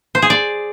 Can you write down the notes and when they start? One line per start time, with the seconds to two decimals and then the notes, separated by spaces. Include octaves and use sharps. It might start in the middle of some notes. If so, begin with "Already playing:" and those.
0.15 C5
0.22 G#4
0.30 D5